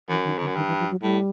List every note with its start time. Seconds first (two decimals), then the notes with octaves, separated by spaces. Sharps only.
0.09 F#2 E3
0.24 D#3
0.38 F2 D3
0.47 F#2
0.56 G2 D#3
0.68 E3
0.79 F3
0.91 F#3
1.02 A2 G3